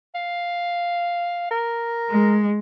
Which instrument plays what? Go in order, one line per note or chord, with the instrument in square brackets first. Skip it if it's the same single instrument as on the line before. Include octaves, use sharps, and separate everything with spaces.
[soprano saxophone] F5
A#4
[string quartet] G#3